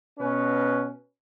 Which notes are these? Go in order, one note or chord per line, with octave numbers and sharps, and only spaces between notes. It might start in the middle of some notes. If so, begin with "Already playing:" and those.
B2 C#4 B4